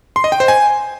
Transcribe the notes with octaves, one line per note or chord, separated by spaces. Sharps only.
C6
D#5
G5
C5
G#5